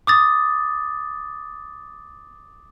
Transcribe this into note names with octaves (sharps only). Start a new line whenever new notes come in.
D6 D#6 A6